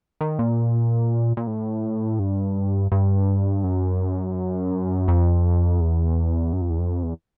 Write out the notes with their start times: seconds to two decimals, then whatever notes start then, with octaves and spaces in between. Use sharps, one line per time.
0.21 D#3
0.39 A#2
1.37 A#2
1.47 A2
2.19 G2
2.92 G2
3.64 F#2
5.08 F2
5.81 E2
6.53 F#2
6.61 F2
6.70 E2
6.79 F2
7.03 E2